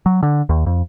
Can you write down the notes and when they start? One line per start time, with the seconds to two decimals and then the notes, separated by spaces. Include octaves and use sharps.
0.06 F#3
0.23 D3
0.49 D#2
0.66 F2